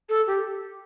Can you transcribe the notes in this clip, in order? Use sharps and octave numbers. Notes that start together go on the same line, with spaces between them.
A4
G4